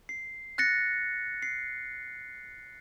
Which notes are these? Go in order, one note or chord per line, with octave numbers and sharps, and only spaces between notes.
C7
F#6 A6 A#6 C#7
C7